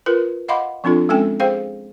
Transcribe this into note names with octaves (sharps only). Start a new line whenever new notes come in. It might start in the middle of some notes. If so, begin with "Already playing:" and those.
F4 A#4 B4
D#5 F5 F#5 B5 C6 D6
F3 C4 D4 F4 A4
G#3 C4 C#4 A4 G5 G#5
G#4 C5 F5 G5